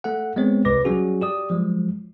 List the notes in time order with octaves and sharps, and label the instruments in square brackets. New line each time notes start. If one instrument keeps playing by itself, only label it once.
[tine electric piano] A3 A4 F#5
G#3 B3 C4 C#5
C2 B4 D6 A#6
F#3 G3 C#4 F#4 G#4
G4 D5 D#6
F3 F#3 G#3